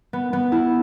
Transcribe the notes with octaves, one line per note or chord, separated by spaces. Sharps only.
B3
B3
E4